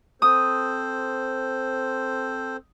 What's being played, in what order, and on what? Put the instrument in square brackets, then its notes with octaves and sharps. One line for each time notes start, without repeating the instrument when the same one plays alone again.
[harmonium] C4 A4 C5 [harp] D#6